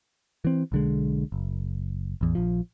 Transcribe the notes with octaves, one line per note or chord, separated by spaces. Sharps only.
E3 C4
B1 D3 G#3
F#1
A1 E2
A#1 F3